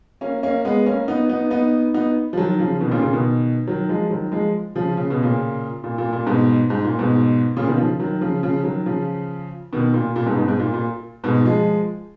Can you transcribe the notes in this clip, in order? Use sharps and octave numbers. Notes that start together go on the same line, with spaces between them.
A#3 C#4
A#3 C#4
G#3 B3
A#3 C#4
B3 D#4
B3 D#4
B3 D#4
B3 D#4
F3
D#3 F#3
C#3 F3
B2 D#3
A#2 C#3
A#2 C#3
B2 D#3
D#3 F#3
F3 G#3
D#3 F#3
F3 G#3
C#3 F3
C#3
B2
A#2 C#3
A#2
A#2
A#2
G#2 B2
G#2
A#2
G#2 B2
A#2 C#3
B2 D#3
C#3 F3
D#3 F#3
C#3 F3
C#3 F3
D#3 F#3
C#3 F3
B2 D#3
A#2
A#2
G#2 B2
G#2 B2
G#2
A#2
A#2
G#2 B2
F3 G#3